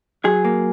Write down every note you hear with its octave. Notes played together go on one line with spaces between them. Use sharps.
F#3 G#4
A#3